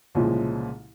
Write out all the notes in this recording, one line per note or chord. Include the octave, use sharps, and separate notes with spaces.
C2 A#2 C#3 F3 G#3